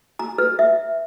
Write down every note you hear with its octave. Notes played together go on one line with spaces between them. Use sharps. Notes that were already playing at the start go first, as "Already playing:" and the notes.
A#5
B4
E5